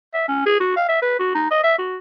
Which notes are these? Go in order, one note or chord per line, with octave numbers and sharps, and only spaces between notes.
E5
C#4
G#4
F#4
F5
E5
B4
F#4
D#4
D#5
E5
F#4